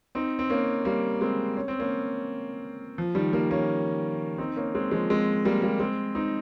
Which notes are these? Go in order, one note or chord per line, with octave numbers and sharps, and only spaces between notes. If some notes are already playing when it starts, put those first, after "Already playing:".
C4 D#4
C4
A#3 C#4
G3 A#3
G#3 C4
C#4
C4
A#3 C#4
F3
D#3 G3
G3 A#3
A#3 C#4
C4 D#4
A#3 C#4
G#3 C4
F3 G#3
G#3 C4
G3 A#3
G3 A#3
G#3 C4
C4 D#4